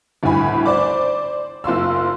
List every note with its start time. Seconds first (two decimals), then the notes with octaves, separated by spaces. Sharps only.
0.23 G1 D2 A2 G#5 B5
0.66 C5 D5 D6
1.64 F#1 F4 C6 E6